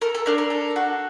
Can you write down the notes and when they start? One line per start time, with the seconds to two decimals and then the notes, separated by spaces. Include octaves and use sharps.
0.02 A4 A#4
0.15 A4
0.26 D4 A#4
0.38 A#4
0.50 A4
0.76 F#4